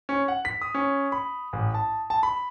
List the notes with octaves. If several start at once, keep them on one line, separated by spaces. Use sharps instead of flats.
C#4
F#5
B6
D#6
C#4
B5
A1
A5
A5
B5